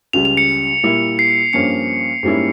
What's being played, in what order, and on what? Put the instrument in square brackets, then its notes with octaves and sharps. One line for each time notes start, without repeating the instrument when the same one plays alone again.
[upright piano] C#2 C#3 G3 [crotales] F7
[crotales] F7
C#7
[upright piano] A#2 G3 A#3 E4
[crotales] C7
[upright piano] G2 F3 A#3 C#4 [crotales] C#7
[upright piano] G#2 G3 A#3 C#4 E4